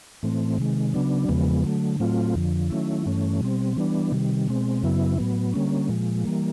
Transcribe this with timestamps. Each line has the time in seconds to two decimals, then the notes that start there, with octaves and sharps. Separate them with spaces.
0.23 A2 E3 A3 C4
0.58 C3 D#3 G#3
0.94 C#3 F#3 B3 D4
1.29 E2 C#3 F3 G#3 B3
1.64 D3 F#3 A3
2.00 A2 F#3 A3 C4 F4
2.35 F2 D3 F3
2.70 D#3 F#3 A3 C#4 E4
3.06 G2 E3 A3 C#4
3.41 B2 G3 C4
3.77 E3 G3 B3 D4
4.12 C3 D#3 G3
4.48 B2 G#3 C4
4.83 F#2 C#3 F#3 B3 E4
5.18 A2 F#3 B3
5.54 D3 G3 A#3 C#4
5.89 A#2 F3 G#3
6.25 E3 G3 A#3